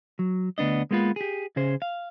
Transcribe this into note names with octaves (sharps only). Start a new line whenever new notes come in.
F#3
D2 B3 D4 D#5
G#3 A#3 B3 F4 B4
G4 G#4
C#3 C#4 G#4 C5
F5